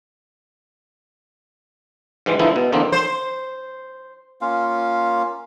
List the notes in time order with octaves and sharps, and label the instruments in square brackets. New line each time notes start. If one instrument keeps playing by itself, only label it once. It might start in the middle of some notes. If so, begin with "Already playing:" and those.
[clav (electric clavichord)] G#2 E3 G3 G#3
D3 E3 F3 G#3 D#4 E4
B2
E2 D3 A#3 C4 D4 D#4
[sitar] C5
[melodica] A#3 C#4 F4 F5